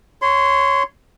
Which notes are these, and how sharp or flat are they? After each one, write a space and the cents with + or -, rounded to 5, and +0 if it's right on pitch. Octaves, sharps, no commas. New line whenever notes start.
C#5 -5 C6 -20